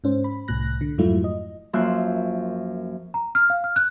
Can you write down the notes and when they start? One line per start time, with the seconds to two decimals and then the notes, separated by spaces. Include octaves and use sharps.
0.04 G#2 C#4 C5
0.24 B5
0.48 C2 A2 F#6 A#6
0.81 D3
0.98 F2 G#2 F#3 A3 E4 F4
1.24 D#5
1.73 F#2 F3 A#3 E5 C6 F#6
3.14 A#5
3.35 F6
3.50 F5
3.64 F6
3.76 F#6